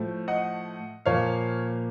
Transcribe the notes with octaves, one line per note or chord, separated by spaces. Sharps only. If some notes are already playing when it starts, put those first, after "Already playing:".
Already playing: A2 F3 A3
D#5 F#5
A#2 F3 A#3 C#5 F5